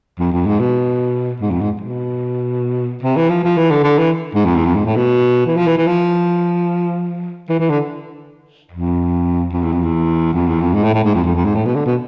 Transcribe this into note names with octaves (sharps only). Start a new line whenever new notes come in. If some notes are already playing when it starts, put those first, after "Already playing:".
F2
F2
G#2
B2
G#2
F2
G#2
B2
C3
E3
F3
F3
E3
D3
D3
E3
G#2
F2
E2
F2
G#2
A2
B2
E3
F3
E3
E3
F3
E3
E3
D3
F2
F2
E2
F2
E2
F2
E2
F2
G#2
A2
A2
G#2
F2
F2
F2
G#2
A2
B2
D3
B2